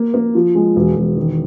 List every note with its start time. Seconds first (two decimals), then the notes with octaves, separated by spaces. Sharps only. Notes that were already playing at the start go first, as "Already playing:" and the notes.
Already playing: A#3
0.14 A#3
0.35 F3
0.55 G#3
0.76 E1
0.96 E1
1.17 D#3